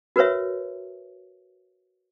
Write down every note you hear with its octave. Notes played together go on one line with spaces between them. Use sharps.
F#4 A#4 B4 C#5 E5